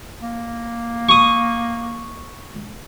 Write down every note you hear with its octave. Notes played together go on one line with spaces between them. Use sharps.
A#3
C#6 D#6